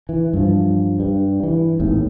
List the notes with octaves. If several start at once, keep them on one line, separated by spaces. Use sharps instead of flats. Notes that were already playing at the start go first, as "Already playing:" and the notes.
E3
G2 F3
G2
E3
G#1 D#2 A2